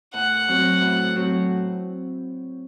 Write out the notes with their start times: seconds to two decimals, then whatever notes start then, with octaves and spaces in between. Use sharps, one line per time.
0.14 A2 F#5
0.48 F#3 C4 F#4
0.82 A2
1.15 F#3 C4 F#4